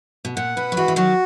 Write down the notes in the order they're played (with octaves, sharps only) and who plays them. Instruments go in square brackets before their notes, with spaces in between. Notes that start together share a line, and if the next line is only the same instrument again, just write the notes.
[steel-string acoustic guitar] B2
[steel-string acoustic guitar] A#2 [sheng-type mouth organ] F#5
[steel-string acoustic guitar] B2 [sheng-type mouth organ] B4
[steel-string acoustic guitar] F#3
[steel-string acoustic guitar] E3 G#3 [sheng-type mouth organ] F#4
[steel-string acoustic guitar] E3
[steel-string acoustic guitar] D#3 F#3 [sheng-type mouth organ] F#4